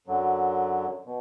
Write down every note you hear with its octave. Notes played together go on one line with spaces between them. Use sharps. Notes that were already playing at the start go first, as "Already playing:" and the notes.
F#2 D3 F#3
B2